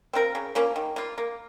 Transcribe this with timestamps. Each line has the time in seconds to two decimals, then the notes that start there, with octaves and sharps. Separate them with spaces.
0.13 C4 F4 A#4
0.35 C#3
0.55 F3 A#3 C#4
0.76 D#3
0.96 A#3 F4
1.18 A#3